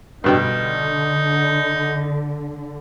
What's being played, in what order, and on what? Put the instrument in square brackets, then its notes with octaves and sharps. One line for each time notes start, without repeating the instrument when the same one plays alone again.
[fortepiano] G2 B2 G5 [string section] D3 [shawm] D#4